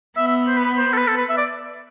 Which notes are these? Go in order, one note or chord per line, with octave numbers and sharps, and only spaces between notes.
B3 E5
E5
C5
B4
C5
A4
B4
A4
B4
E5
D5